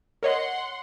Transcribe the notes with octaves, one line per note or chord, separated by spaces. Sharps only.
A#4 C#5 D#5 F#5 C6